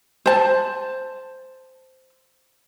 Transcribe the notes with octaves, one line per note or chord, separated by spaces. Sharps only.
C5 A5